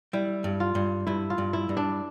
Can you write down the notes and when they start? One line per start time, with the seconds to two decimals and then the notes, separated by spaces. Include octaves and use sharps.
0.13 G3 E4
0.44 G2
0.60 F4
0.75 G2
1.07 G2 E4
1.30 F4
1.38 G2
1.53 E4
1.69 G2
1.77 D4